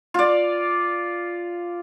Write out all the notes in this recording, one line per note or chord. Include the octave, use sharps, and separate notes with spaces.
F4 D5